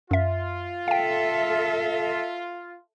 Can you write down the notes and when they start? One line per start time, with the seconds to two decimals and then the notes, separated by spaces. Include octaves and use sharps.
0.11 F#2 F4 E5
0.88 A4 E5 F5 G5